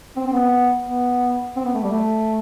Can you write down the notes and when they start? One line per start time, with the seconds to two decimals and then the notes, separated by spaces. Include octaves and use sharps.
0.16 C4
0.27 C4
0.33 B3
0.86 B3
1.56 C4
1.65 B3
1.74 A3
1.84 G3
1.92 A3